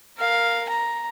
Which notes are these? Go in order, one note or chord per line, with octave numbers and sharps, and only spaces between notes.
A#4 F5
A#5